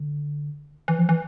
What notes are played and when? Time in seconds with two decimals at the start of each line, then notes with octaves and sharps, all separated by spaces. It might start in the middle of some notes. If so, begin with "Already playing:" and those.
Already playing: D3
0.88 E3
0.99 F3
1.09 E3